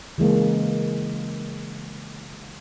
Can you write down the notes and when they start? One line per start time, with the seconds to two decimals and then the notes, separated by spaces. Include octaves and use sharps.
0.18 C#3 E3 G#3 A#3